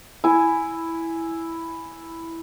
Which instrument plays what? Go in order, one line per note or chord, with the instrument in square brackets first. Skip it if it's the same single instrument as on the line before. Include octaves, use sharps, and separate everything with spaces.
[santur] E4 G#5